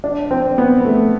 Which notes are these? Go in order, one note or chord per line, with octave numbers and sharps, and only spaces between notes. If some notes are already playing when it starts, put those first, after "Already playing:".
D4
C4
B3
A3